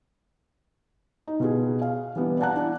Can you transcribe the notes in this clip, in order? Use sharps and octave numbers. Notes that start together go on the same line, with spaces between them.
D#4
B2 F4 G#4
F5
E3 G3 B3 D4
D5 F5 F#5 A5 A#5 F#6
D4 E4